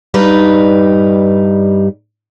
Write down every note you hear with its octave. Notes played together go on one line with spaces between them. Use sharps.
G2 G3 D#4 B4